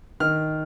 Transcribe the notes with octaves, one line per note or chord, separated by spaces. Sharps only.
D#3 F6